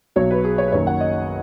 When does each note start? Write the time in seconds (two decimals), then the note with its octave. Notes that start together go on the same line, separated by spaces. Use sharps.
0.16 B1 B2 F#3 C#5
0.31 B4
0.44 G#4
0.58 C#5
0.68 B4
0.72 F#1 F#2 D#3 F#3 C#5
0.87 F#5
1.00 D#5